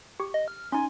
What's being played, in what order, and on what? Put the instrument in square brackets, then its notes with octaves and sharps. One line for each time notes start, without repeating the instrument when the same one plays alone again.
[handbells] G4 C#6
[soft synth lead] D#5
F6
[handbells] C#4 D#4 [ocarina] G#5 [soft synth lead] C6